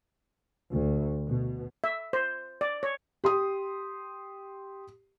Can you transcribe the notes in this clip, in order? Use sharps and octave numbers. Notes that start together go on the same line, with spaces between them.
D2
B2
E5
C5
D5
C#5
G4 C6 D#6